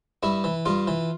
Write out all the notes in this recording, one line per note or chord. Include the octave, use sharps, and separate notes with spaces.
G2 E4
E3
G2 F4
E3